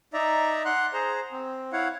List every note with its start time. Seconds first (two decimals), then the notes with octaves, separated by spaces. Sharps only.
0.13 D#4 D5 E5 A#5
0.65 F#5 C6 F#6
0.93 G#4 C5 A#5
1.32 C4
1.73 E4 C#5 F5 F#5